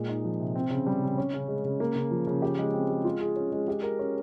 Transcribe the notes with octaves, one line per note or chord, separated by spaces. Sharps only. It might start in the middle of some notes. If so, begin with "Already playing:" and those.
Already playing: A#2 G#3
D#4
F3
C3
C4
C#3
G3
C#3
C#4
C#3
G#3
C#3
A#3
C#3
F3
C#3
G4
G#3
C4
G#3
F4
G#4
C#4
G#3
G4
A#4
C#4